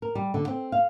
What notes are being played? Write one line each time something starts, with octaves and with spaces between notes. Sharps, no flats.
A#4
G3
D3
C4
F5